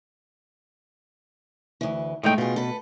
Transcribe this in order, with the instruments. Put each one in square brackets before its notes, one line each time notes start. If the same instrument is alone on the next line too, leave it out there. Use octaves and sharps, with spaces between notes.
[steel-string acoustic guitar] D2 E3
[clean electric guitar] A2 D#4 G5 [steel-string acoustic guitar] G#3 A3
[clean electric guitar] B2 [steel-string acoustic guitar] F4 G#4
[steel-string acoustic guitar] A4 B4